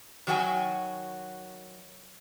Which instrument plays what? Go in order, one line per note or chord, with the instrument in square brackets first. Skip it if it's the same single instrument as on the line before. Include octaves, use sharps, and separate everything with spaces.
[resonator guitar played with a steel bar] D#3 F#3 F#4 G#4 G5 G#5